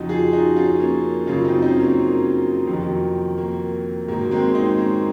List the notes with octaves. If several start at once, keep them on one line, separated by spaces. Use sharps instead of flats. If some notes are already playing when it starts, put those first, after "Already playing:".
Already playing: F2 C#3 F3 D#4 F#4
F4 G#4
D#4 F#4
C#4 F4
A#3 C#4
F#2 C#3 F#3 C#4 F4
C4 D#4
C4 D#4
A#3 C#4
F2 C3 D#3 F#3
A#3
G#2 D#3 F#3 A#3
G#3 C4
C4 D#4
A#3 C#4